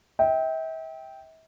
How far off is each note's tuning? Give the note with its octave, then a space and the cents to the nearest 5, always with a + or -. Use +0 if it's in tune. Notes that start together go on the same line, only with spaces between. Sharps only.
E5 -40 G5 +0